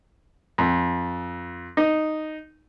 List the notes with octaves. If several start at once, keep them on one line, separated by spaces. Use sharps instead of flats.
F2
D#4